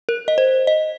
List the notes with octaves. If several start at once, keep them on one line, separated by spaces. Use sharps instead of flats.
A#4
D#5
C5
D#5